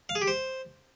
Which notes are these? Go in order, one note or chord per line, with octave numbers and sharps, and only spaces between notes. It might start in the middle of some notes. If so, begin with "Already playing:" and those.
F5
G#4
G4
C5